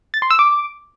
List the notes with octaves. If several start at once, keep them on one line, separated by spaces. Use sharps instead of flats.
A6
C6
E6
D6